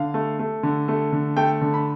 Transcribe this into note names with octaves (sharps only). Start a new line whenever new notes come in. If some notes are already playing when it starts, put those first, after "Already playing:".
Already playing: D3 F5
A3
A3
D3
A3
D3
A3 G5
D3
B5